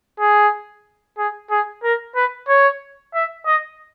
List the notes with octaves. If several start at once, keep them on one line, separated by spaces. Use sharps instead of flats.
G#4
G#4
G#4
A#4
B4
C#5
E5
D#5